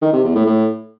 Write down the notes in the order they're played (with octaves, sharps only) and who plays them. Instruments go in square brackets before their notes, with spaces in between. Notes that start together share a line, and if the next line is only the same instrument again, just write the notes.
[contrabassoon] D#3
C3
E2
A2
A2